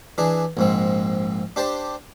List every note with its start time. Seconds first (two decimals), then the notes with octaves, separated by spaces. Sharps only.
0.18 E3 D4 G#4
0.57 A#1 G#2 C4
1.56 D4 G4 C5 A5